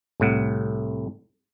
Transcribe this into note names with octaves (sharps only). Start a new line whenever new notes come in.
C2 A2 F#5